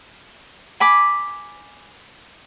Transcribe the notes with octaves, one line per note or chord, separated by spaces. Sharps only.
G#5 B5 D6